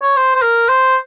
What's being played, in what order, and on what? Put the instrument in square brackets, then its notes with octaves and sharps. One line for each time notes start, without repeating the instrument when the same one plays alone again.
[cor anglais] C#5
C5
C5
A#4
C5